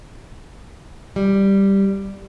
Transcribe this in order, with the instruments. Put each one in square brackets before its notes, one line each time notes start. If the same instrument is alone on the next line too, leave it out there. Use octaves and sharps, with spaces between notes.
[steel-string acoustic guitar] G3